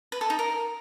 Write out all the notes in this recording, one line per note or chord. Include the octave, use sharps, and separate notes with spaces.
B4
A4
D#4
A#4